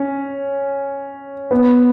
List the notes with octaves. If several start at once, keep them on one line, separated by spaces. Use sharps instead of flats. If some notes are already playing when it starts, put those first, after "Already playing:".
Already playing: C#4
B3